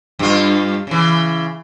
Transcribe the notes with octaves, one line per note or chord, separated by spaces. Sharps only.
G2 F4
C#3 E3